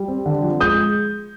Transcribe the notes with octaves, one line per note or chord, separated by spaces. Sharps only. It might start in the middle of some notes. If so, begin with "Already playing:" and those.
Already playing: G3
C4
D3
F3
G#3 D#6 G6